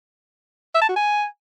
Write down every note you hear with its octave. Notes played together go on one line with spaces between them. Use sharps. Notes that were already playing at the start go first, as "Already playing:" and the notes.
E5
A5
F#4
G#5